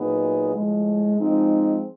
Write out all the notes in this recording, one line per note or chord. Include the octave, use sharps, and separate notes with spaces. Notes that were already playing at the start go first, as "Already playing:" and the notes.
Already playing: A#2 F#3 B3 D#4 G#4
A2 F3 G#3
F3 G#3 C4 D#4